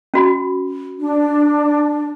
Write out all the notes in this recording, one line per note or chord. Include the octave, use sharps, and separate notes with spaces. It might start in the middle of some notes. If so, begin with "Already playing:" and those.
C#4 F#4 B5
D4